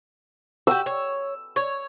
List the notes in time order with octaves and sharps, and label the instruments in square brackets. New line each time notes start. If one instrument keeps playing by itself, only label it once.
[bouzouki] F#4 G4 [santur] E6
[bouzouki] C#5
C#5